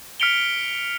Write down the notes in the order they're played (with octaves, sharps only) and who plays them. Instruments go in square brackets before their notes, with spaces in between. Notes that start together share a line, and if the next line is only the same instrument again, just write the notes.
[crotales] F6 B6 C#7 D7 F7 G7